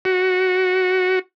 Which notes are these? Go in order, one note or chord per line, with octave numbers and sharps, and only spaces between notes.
F#4